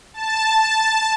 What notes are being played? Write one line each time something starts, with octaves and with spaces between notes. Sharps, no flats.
A5